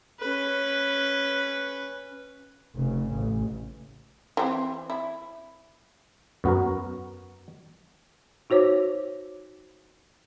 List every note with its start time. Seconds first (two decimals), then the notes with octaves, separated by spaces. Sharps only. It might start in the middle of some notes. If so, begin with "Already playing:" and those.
0.20 C#4 B4
2.76 F1 C#3
3.12 A1
4.37 E3 C4
4.90 E4
6.44 F#2 B3 F#4 A#4
8.50 D#4 F#4 C5 C#5 D6